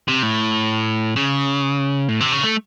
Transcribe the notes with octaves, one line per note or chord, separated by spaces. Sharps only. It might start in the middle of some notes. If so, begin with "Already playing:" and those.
C3
A2
C#3
A2
C3
C#3
A3